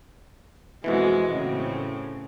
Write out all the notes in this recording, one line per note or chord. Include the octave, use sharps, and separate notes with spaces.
F2 B2 E3 G#3 F#4
A2 C#3 C4